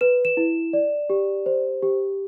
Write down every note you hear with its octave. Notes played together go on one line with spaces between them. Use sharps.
B4 E7
E7
E4
D5
G4
C5
G4